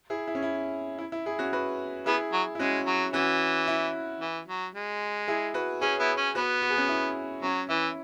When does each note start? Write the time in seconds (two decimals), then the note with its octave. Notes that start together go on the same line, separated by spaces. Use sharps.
0.10 E4 G#4
0.28 E4
0.35 C#4
0.43 E4
0.99 E4
1.12 E4
1.26 E4 G#4
1.39 C#4 F#4
1.53 F#4 B4
2.06 B3 E4 G#4
2.33 F#3
2.55 E4
2.59 G#3 C#4 F#4
2.86 F#3
3.13 E3 C#4 F#4
3.68 E4
4.21 E3
4.48 F#3
4.75 G#3
5.28 E4 G#4
5.54 F#4 B4
5.82 C#4 G#4 C#5
5.99 B3 E4
6.17 C#4
6.35 B3 F#4 B4
6.62 F#4
6.70 G#4
6.78 C#4 F#4
6.89 E4
7.42 F#3 C#4
7.69 E3 E4